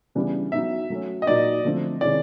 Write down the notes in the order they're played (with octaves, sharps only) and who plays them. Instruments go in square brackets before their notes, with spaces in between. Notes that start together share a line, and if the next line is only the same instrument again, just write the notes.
[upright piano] C#3 E3 G3 B3 D4
[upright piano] F#3 B3 D#4 [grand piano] E5
[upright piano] F#3 A3 C#4
[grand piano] D#5
[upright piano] A#2 F#3 A#3 D#4 [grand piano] D5
[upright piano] D3 F3 A3 C4
[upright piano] C3 D#3 G#3 C#4 E4 [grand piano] D5